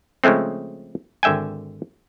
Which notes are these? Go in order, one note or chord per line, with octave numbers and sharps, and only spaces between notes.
C#3 F3 G#3 A3 C4
G#1 D3 E5 G5 G#5